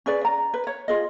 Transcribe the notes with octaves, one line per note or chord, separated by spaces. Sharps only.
C#4 G#4 B4 D5
A#5
B4
C#5
F4 G#4 D#5